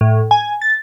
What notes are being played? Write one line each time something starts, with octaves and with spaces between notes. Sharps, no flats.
A2
G#5
A6